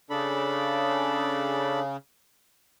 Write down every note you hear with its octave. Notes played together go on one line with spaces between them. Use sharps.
C#3 D4 A4 B5